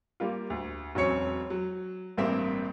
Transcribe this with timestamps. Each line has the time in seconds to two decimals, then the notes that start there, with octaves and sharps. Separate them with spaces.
0.20 G3 A#3 F4
0.50 D2
0.95 E1 F#3 C4 C#4 C#5 C#7
1.50 F#3
2.18 A1 G2 A#3 C4 E5